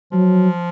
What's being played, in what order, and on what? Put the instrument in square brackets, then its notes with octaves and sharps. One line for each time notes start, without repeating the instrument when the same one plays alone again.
[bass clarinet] F3 [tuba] F#3